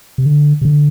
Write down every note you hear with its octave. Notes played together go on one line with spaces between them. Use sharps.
C3
D3
C3
D3